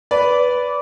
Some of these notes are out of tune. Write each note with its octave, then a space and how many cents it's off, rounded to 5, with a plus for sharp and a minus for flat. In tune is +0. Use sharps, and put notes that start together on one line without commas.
B4 +0 D5 -20